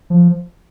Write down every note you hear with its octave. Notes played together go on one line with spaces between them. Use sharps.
F3